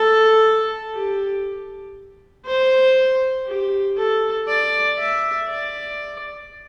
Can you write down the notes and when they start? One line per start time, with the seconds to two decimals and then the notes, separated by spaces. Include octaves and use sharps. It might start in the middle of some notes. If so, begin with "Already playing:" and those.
Already playing: A4
0.94 G4
2.46 C5
3.47 G4
3.98 A4
4.48 D5
4.99 E5
5.49 D5